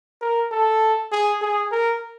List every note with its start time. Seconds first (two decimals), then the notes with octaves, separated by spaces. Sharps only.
0.21 A#4
0.52 A4
1.12 G#4
1.42 G#4
1.72 A#4